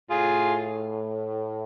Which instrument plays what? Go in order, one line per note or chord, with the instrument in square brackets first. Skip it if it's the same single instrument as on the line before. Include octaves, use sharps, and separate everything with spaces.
[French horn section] A2 [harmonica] F4 G#4